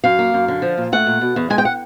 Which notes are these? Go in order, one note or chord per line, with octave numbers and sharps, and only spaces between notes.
F#2 F5
A#3
F#2
D3
F3
A#2
A3 F#5
A#2
B2
E2
G#3 G#5
G5
F#5